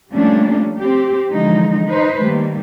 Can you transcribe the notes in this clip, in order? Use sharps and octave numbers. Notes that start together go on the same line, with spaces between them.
F3 G3 A3 A#3 C#4 D4
C4 G4
D3 E3 F3 G#3 D#4
D#4 B4 C5
D#3 G3 A3 A#3